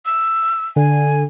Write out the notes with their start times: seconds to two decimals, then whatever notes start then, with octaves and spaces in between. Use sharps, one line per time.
0.06 E6
0.76 D3 G#5